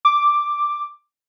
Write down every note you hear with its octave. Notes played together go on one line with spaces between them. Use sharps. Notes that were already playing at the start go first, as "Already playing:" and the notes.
D6